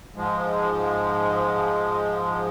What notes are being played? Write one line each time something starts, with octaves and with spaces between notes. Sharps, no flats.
G#2 F3 G#3